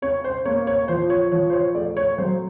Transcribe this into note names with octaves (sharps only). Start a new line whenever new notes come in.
C#4 C#5
C5
A#3 C#5
C#5
F3 C5
C#5
F3 C#5
C5
C#5
A3 D5
C#5
F#3 C5